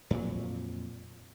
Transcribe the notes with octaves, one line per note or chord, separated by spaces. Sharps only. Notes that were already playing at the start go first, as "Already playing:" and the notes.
F2 A#2 F#3